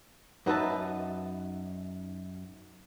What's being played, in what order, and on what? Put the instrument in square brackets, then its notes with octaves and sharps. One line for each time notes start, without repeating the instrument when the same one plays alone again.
[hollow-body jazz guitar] F#2 D#4 B4 E5 A5